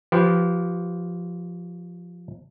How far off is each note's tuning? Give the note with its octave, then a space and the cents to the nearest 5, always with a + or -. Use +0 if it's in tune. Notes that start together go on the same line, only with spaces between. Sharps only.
F3 +0 G4 -25 B4 +0